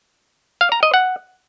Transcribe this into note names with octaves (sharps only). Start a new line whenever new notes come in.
F5
A#5
D#5
F#5